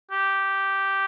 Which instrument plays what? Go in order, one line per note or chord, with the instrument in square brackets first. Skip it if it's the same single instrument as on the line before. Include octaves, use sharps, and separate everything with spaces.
[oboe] G4